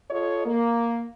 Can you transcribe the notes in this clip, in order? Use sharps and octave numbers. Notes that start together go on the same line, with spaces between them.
F4 A4 C#5 D#5
A#3